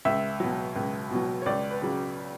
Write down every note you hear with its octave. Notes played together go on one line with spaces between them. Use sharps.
C#2 E5
B2 F#3
C#2
B2 F#3
C#5
C#2 D5
B4
C#3 F#3